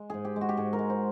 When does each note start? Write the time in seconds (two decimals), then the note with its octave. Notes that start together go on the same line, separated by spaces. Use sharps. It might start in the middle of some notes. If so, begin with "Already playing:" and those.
Already playing: G#3
0.10 G#2 G#4
0.25 G4
0.36 G#3
0.41 F#4
0.49 G4
0.57 G#2 G#4
0.73 A#4
0.79 G#3
0.90 C5